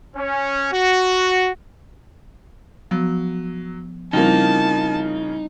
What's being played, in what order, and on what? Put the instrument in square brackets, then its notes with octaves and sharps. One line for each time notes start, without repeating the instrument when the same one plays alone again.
[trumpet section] C#4
F#4
[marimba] F3 B3 [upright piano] F#3
[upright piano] C#3 F3 A#3 [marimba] G3 C4 E4 [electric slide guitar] D#4 [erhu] A5